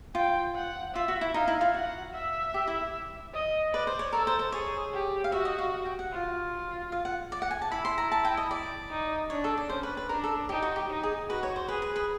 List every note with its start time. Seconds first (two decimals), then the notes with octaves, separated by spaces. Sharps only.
0.15 F4 G5
0.56 F#5
0.95 F4 E5
1.08 F#4
1.21 E4
1.34 D#4 F5
1.48 E4
1.61 F4
1.74 F#4 F#5
2.14 E5
2.54 G4
2.68 E4
3.34 D#5
3.73 B4 D5
3.87 C5
3.99 C#5
4.13 A4 A#4
4.27 C5
4.39 C5
4.52 G#4 C#5
4.93 G4
5.24 F5
5.32 F#4 E5
5.45 D#5
5.58 F5
5.85 G5
5.99 F#5
6.12 F4
6.92 F5
7.05 F#5
7.32 D5
7.42 F#5
7.51 G#5
7.62 A5
7.71 E4 B5
7.85 C6
7.98 A#5
8.12 A5
8.25 G5
8.37 D#5
8.51 D5
8.90 D#4
9.30 D4 C#5
9.44 A4
9.57 D5
9.69 C#4 C5
9.83 B4
9.97 B4
10.09 D4 A#4
10.24 A4
10.49 D#4 G4
10.62 F#4
10.76 G4
10.90 D#4
11.03 G#4
11.29 F#4 B4
11.43 C#5
11.56 C5
11.68 G#4 B4
11.82 B4
11.96 B4